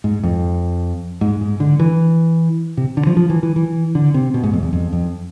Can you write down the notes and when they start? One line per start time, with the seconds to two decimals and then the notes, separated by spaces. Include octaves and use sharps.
0.04 G#2
0.23 F2
1.21 G#2
1.41 G#2
1.60 D3
1.80 E3
2.77 C3
2.97 D3
3.07 F3
3.17 F3
3.30 E3
3.43 E3
3.56 E3
3.95 D3
4.14 C3
4.34 B2
4.44 G#2
4.53 F2
4.63 E2
4.73 F2
4.93 F2